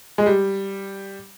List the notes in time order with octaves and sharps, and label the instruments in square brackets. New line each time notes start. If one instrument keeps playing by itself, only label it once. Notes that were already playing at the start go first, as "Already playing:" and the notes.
[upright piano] G#3
G3